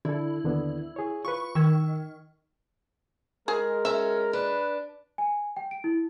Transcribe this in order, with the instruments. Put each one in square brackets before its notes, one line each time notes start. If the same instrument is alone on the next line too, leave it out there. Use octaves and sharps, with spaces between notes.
[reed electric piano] D3 A4 [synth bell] E4
[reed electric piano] D#2 D3 B3
G#4 C#5
[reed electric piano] F4 B4 [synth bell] C#6
[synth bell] D#3 [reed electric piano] C#6 E6 G#6
[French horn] G#3 [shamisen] G#4 [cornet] A#4
[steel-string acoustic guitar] C#4 [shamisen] E5
[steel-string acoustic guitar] D4 [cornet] B4
[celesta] G#5
G5
D7
E4